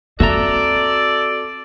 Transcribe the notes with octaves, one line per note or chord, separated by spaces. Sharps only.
C4 F#4 A4 D5 E5 A#5